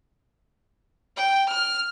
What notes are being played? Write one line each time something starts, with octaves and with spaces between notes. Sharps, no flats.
G5
F6